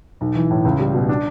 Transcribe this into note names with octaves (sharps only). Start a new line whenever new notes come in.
B1
E3
A2
C#2
G3
B2
D4